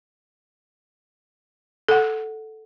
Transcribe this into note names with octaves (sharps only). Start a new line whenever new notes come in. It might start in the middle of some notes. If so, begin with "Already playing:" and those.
A4 F#5